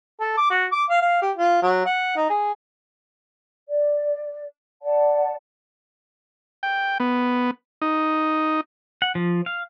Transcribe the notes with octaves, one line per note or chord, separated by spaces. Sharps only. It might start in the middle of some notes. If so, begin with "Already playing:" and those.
A4
D6
F#4
D6
F5
F5
G4
F4
F#3
F#5
D#4
G#4
D5
D5 F#5 A5
G5
B3
D#4
F#5
F3
F5